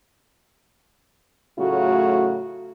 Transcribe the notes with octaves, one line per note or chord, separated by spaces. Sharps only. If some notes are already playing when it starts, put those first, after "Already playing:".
A2 C#3 F#3 A3 F4 F#4